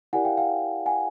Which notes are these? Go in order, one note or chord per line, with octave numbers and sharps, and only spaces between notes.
E4 G4 A#4 D5 F#5 G#5
F5 G5
F5 G5
F#5 G#5